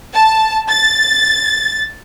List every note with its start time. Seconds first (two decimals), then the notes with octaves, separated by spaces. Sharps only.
0.14 A5
0.69 A6